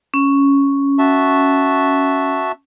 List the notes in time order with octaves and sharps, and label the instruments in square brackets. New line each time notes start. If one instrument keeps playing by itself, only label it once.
[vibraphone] C#4
[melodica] F#4 E5 A5